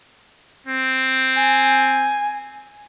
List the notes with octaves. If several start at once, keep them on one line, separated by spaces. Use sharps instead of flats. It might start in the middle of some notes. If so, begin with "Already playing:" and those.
C4
G#5